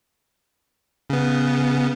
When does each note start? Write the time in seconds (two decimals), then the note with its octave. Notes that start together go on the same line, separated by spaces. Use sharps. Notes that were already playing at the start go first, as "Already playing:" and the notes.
1.10 C#3 B3